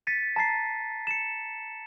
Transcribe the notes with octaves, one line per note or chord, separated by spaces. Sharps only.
A6 B6 C#7 D#7
A5 A#5 A6 C7
C#7 E7